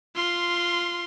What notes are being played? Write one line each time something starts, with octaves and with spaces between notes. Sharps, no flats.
F4 C6